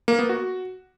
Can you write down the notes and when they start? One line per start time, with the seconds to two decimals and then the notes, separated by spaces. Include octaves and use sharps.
0.08 A#3
0.19 B3
0.29 F#4